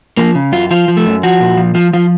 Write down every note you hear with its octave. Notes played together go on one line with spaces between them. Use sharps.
F3 A#3
C#3
F#2 F4
F3 F4
F3
A3
F#2
F3 F#4
A#2
F3
F3 F4
F3 F4